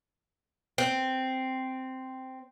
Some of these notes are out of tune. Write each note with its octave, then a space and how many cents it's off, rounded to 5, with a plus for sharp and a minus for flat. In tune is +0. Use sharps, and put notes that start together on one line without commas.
C4 -5